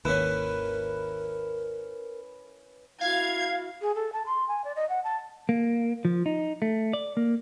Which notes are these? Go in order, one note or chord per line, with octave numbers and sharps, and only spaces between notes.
G#1 D#2 C#4 E4 A#4 B4
E4 F#4 F5 G#6
G#4
A4
A5
C6
G#5
D5
D#5
F#5
A5
A#3
F3
D#4
A3
D5
A#3